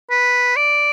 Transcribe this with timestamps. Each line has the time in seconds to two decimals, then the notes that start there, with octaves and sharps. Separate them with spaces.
0.10 B4
0.56 D5